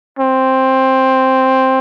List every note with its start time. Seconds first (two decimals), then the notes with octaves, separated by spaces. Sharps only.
0.20 C4